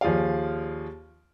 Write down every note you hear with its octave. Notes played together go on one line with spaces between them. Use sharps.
D#2 F3 G#4 D5 F5